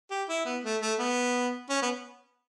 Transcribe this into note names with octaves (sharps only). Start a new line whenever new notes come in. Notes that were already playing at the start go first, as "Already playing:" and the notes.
G4
E4
B3
A3
A3
B3
C#4
B3